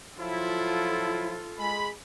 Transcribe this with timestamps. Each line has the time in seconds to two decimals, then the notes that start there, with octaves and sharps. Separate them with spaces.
0.18 F3 F#3 E4 F4 A4
1.59 G#3 B5